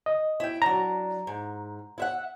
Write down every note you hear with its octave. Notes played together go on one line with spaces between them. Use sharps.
D#5
E4 G5
F#3 D4 A#5
G#2
E4 E5 F#5